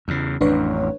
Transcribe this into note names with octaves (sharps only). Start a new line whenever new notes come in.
E2 C#3
A1 F2 D4 B4 C#5